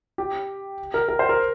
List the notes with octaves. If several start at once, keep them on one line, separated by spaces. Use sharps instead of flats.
G4
A#4
A#4
C5
A#4